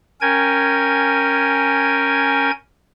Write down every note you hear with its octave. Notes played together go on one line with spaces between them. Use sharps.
C#4 A#4 G5 G#5 G#6